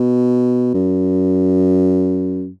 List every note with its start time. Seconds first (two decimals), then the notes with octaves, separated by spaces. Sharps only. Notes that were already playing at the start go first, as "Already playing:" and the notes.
Already playing: B2
0.74 F#2